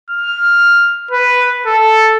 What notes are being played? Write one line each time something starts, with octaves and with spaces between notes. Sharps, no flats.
F6
B4
A4